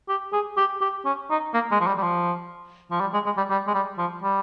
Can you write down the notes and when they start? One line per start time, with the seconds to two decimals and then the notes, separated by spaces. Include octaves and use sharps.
0.09 G4
0.33 G#4
0.57 G4
0.81 G4
1.05 C#4
1.30 D#4
1.54 A#3
1.71 G#3
1.80 F3
1.87 G3
1.98 G3
2.03 F3
2.91 F3
3.01 G3
3.14 G#3
3.26 G#3
3.37 G3
3.50 G3
3.68 G#3
3.74 G3
3.98 F3
4.23 G3